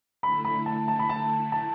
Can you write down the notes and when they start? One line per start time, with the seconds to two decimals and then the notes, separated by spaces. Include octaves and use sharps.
0.23 D3 A3 E4 B5
0.45 B5
0.66 A5
0.88 A5
0.99 B5
1.09 A5
1.52 A5